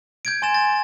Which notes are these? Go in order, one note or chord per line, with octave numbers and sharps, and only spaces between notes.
G6 G#6 D7
G#5 C6 A6 E7
A6